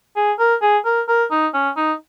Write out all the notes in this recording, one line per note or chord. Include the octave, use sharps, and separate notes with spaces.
G#4
A#4
G#4
A#4
A#4
D#4
C#4
D#4